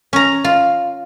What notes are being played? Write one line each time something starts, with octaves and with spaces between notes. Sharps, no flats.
C#4 A#5
F4